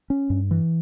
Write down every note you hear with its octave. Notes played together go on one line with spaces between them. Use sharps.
C#4
G2
E3